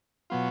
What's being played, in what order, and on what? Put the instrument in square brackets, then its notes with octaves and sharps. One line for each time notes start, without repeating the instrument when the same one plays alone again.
[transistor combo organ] B2 F#3 B3 F4